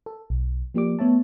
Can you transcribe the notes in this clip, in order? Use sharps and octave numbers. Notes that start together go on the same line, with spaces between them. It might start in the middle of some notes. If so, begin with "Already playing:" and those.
A4
B1
F3 A#3 G4 D5 D6
A3 B3 C#5 E5 A5